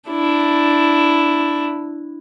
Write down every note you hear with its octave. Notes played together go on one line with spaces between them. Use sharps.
D4 E4